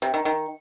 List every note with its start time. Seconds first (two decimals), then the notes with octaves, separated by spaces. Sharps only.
0.02 C3
0.14 D#3
0.25 D#3